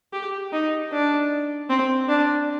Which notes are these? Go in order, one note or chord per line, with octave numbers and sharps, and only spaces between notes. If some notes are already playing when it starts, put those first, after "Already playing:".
G4
D#4
D4
C4
D4